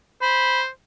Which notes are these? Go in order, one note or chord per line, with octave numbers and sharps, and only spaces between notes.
C5 B5